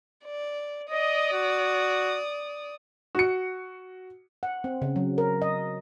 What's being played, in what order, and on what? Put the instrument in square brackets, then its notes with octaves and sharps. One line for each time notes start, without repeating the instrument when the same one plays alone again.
[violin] D5
[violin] D5 D#6 [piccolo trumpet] D#5
[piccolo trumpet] F#4
[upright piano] F#4 C#7
[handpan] F#5
C4
C#3
F#3
A#4
D#5